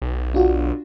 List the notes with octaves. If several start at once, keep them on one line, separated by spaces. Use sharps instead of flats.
B1
D4 F4 F#4